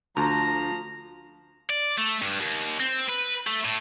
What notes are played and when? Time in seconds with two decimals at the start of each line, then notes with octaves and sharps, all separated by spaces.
0.17 D2 F3 A5 A#5
1.70 D5
1.98 A3
2.22 G2
2.41 D#2
2.80 C4
3.09 B4
3.47 A3
3.65 A2